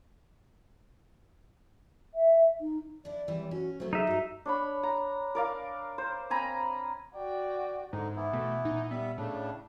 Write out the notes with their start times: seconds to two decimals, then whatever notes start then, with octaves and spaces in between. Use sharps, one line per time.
2.14 E5
2.61 D#4
3.05 D4 E4 D5
3.27 C3 E3 G3
3.51 C#4 F#4
3.80 F#3 A3 B3 C5
3.93 D#4 G#4 E5
4.07 G2 G3 F#4
4.45 D4 C#5 B5
4.83 A#5
5.35 A#4 D5 F5
5.98 C5
6.30 C4 G#5 A#5 B5
7.15 F#4 D5 G5
7.93 G#2 D3 D#4
8.16 E3 B3 E4
8.33 B2 A3
8.65 A#2 D#4
8.91 G3 B3 E5
9.18 A2 C#3 D4